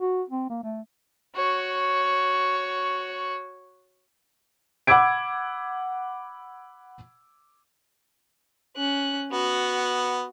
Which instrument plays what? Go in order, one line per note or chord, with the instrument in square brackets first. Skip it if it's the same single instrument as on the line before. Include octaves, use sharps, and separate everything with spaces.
[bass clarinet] F#4
C4
A#3
A3
[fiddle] F#4 C#5
[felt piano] F#5 B5 D6 E6 G#6 D7
[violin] C#4 F#6
[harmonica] B3 [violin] F#4